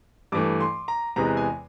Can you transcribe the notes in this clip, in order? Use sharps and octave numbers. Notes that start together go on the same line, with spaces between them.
G2 E3 A3 D6
C6
A#5
E2 C3 E3 G#3 B3 A#5
G#5